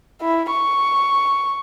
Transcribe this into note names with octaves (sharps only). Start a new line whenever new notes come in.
E4
C#6